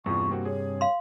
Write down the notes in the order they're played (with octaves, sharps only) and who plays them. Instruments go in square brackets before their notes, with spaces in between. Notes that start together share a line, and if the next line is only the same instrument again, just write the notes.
[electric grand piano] E2 F4 [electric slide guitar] G2 C3 [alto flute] C#6
[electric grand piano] A#3 C4 F#4
[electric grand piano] G#4 [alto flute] C#5
[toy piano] F5 C6